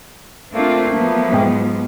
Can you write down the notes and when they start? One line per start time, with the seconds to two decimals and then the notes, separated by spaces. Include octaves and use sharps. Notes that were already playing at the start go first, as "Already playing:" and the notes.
0.53 A3 A#3 C4 D4 F4
0.97 F3 F#3 B3
1.32 G#2 G5